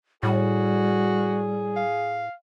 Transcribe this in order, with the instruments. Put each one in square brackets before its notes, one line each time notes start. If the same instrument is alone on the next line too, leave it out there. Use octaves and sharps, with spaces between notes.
[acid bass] A2 [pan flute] G3 [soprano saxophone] F#4 [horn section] G#4
[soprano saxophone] F5